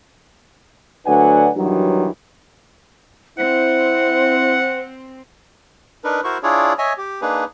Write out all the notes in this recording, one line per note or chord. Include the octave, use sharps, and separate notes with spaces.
D2 F#3 D4 B4 F#5 G#5
G2 D#3 E3 F#3
C4 E4 C5 F#5
D4 D#4 A#4 B4
E4 F#4 A#4 C5 C#6
D4 E4 F4 G#4 C#5 D5
C#5 D#5 E5 G#5
G4
A#3 D4 D#4 G#4 B4